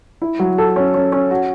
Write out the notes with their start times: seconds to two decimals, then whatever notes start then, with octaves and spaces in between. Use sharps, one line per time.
0.22 E4
0.39 F#3
0.58 A4
0.76 C#4
0.94 C#4
1.12 C#4
1.31 F#4